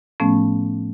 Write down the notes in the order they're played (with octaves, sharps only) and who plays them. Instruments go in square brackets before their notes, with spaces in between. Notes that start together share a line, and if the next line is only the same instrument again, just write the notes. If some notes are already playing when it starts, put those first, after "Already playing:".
[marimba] A2 F3 A3 B3 C#4